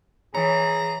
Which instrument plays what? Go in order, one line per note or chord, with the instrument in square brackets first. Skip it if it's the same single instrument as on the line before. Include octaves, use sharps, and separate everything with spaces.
[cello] E3 [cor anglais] G#4 [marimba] C#5 [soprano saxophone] A#5